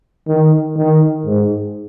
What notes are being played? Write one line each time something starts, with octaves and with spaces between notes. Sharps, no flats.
D#3
D#3
G#2